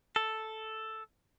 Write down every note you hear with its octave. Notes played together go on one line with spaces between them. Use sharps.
A4